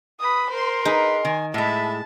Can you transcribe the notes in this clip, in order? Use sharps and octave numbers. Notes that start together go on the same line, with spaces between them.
B4 B5 D#6
A#4 C5 C6
D#4 G#4 B4
D#3 G#5
A2 G#3 E5 A5 B5